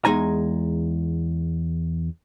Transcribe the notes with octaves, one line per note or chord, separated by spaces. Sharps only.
E2 G#3 D#4 G#5 A#5